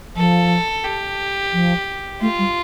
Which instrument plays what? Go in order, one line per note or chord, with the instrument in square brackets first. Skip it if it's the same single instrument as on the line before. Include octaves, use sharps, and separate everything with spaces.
[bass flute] F3 [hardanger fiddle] A4
[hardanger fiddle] G4
[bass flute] F3
[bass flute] A3 [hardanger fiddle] F4
[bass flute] G3